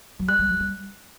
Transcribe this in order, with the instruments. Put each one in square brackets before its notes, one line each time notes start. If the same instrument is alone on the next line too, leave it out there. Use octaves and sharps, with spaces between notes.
[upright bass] F#3
[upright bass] G3 [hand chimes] F#6
[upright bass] G3
F#3
G3